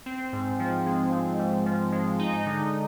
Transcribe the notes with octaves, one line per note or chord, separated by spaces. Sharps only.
C4
G#2
F3
G#3
C4
G#2
F3
G#3
D#4
D3